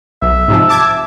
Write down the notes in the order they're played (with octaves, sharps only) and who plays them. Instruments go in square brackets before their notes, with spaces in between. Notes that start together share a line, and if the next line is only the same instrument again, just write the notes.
[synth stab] B1 [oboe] E5
[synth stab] G#2 C3 F3
A5 D6 G#6